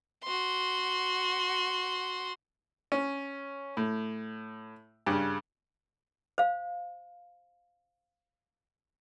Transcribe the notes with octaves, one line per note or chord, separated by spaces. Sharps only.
F#4 C6
C#4
A2
G2 C#3
C5 F5